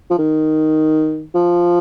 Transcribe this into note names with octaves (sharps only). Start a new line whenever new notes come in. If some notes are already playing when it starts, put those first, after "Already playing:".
F3
D#3
F3